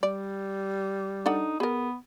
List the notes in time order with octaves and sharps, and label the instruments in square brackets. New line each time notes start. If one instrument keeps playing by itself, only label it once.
[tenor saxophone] G3 [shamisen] D5
[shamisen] D4 A4 F#5 [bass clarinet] D#4
[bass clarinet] B3 [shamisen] G#4 A#4